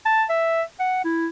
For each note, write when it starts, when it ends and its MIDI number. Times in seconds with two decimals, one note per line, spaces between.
0.06 0.24 81
0.29 0.62 76
0.80 1.00 78
1.05 1.28 64